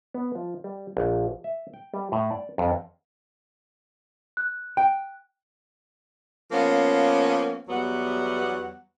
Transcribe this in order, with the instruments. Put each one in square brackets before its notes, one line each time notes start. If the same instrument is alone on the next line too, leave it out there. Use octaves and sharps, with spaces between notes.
[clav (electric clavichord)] B3
F3
G3
A#1
E5
G5
G3
A2
D5
F2
[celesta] F#6
[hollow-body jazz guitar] G5
[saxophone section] F3 A#3 B3 C#4
E2 F#3 G3 B3 F#5